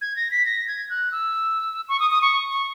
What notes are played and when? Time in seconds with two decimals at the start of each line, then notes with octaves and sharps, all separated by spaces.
0.01 G#6
0.16 A#6
0.31 B6
0.45 A#6
0.68 G#6
0.89 F#6
1.12 E6
1.89 C#6
2.00 D#6
2.11 D#6
2.22 C#6
2.51 C#6